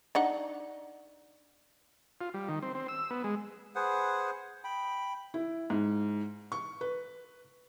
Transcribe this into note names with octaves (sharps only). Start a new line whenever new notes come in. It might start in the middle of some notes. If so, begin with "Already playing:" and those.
D4 D#4 F#5
F4
G3
D#3
C4
C4
E6
B3
G#3
G#4 B4 C5 F#5
G5 B5
E4
G#2
C#6
B4